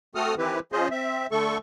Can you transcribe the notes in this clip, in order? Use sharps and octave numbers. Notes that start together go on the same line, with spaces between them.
A3 C4 F#4 A4 D#6 F6
D#3 E3 C4 E4 G4 B4
F3 C#4 F4 G#4 C5 D#5
C4 E5
D3 A3 A4 C#6